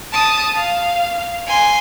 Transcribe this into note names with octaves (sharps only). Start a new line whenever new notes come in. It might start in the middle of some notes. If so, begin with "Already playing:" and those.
A5 D#6
F5
G#5 C6